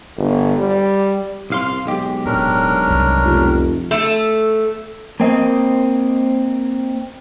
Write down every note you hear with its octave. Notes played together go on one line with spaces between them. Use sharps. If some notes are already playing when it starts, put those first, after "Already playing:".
G1
G3
C2 F5 C6
B1 G#3 G4
D1 C#4 D4 A#4
C2
F1
A3
A#3 C4 D#5